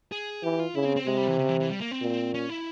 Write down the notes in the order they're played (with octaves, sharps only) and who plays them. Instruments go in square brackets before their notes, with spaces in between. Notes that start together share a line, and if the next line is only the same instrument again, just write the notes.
[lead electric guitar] G#4
[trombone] E3 [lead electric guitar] G4
[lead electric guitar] F4
[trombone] C#3 [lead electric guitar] E4
[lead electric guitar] C4
C4
[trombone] C3 [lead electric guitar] G#3
[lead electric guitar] G3
E3
C#3
E3
E3
G3
A#3
C4
[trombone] A#2
[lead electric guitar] C#4
E4